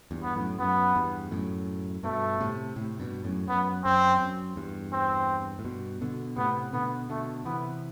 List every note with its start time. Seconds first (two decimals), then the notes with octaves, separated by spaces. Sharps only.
0.11 E2 G2
0.23 B3
0.35 F#2 A2
0.59 F#2 B3
0.96 E2 G2
1.31 F#2 A2
2.03 G2 B2 A3
2.40 A2 C3
2.76 A2 C3
3.00 G2 B2
3.24 F#2 A2
3.48 F#2 B3
3.84 F#2 C4
4.20 F#2
4.56 E2 G2
4.93 C4
5.59 A2
5.65 G2 B2
6.01 B2 D3
6.37 A2 C3 B3
6.73 B2 D3 B3
7.09 B2 D3 A3
7.45 C3 E3 B3